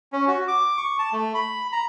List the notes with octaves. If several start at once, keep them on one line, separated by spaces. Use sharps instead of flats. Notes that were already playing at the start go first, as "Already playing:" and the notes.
C#4
F#4
D6
C#6
A5
A3
B5
A#5